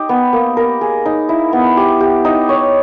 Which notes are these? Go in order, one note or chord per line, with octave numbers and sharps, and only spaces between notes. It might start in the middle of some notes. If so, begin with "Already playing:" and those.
Already playing: D#4 G4
B3
A#3
A#4
G#4
D#4
E4
B3
G4
G4
D#4
C#5